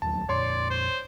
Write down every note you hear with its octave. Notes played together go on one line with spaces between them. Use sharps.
E1 D#2 F#3 A5
F2 A#2 C#5 D5 C6
C5